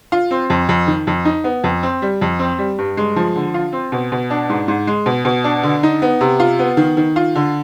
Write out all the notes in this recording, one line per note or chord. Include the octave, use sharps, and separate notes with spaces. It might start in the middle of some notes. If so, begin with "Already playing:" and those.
F4
C4
F2
F2
D#3
F2
D#4
B3
F2
C4
G3
F2
C4
G3
G2
G#3
F3
D3
F4
C4
B2
B2
D4
G#2
G#2
G#3
B2
B2
D4
D3
D#4
B3
C3
F4
B3
D#3
D#3
F4
D3